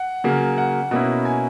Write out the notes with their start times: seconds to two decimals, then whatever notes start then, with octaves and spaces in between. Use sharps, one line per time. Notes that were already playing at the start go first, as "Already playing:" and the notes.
Already playing: F#5
0.24 C#3 F#3 A#3
0.58 F#5
0.91 B2 A#3 C#4 E4
1.25 G#5